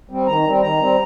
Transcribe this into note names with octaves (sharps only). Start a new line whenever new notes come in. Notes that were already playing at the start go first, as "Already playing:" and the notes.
G3 C4
D#3 A#5
G3 C4
D#3 A#5
G3 C4